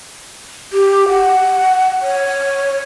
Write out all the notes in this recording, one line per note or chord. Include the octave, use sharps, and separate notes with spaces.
G4
F#5
C#5